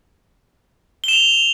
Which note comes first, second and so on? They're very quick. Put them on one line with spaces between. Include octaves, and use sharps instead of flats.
G7 E7 F7